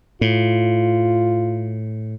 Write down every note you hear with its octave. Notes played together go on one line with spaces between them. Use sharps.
A2 F4